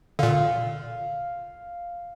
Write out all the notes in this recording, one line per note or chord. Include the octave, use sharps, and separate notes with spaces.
A#2 D3 F5